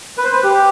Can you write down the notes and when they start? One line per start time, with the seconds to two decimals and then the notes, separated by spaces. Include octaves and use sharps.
0.18 B4
0.24 C5
0.33 B4
0.43 G4